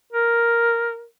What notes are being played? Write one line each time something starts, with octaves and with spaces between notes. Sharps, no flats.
A#4